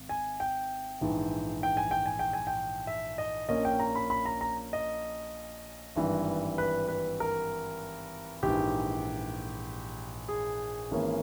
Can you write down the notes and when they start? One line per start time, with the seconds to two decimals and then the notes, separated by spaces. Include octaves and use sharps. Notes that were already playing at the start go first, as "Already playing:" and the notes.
Already playing: G#1
0.09 G#5
0.40 G5
1.01 A#1 G#2 E3
1.63 G5
1.77 G#5
1.91 G5
2.06 G#5
2.19 G5
2.33 G#5
2.47 G5
2.87 E5
3.18 D#5
3.48 A#1 A#2 A#3 C#4 D#5
3.65 G5
3.80 A#5
3.96 B5
4.10 B5
4.26 A#5
4.41 A#5
4.73 D#5
5.95 G#1 G2 E3 G3
6.58 B4
6.88 B4
7.20 A#4
8.43 A#1 G#2 E3 G4
10.28 G#4
10.91 G#1 G#2 E3 A#3 C#4